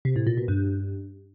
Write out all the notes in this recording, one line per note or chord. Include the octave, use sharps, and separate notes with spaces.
C3
A2
A#2
B2
G2